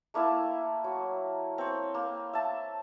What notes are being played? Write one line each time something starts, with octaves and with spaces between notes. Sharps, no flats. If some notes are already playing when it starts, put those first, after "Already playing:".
A3 A#3 E4 A5
F#3
C4 C#5
A#3
E5 A5